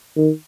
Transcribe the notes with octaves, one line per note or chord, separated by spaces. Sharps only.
D#3